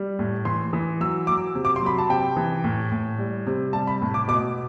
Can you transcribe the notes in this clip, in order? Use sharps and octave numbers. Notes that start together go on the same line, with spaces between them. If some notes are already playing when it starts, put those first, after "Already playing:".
Already playing: G3
A2
E3 C6
E3
F#3 E6
F#3 D6
C3
D6
C6
F#3 B5
A5
C3 G5
E3
A2
A2
G3
C3
G3 A5
B5
A2
D6
B2 D6